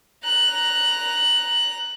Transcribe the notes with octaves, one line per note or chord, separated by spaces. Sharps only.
A#5 F#6